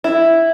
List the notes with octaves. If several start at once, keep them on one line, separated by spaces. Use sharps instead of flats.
E4